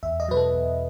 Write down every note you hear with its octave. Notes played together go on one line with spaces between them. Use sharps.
E2 E5
D#5
B2 F#3 B4
A4
E2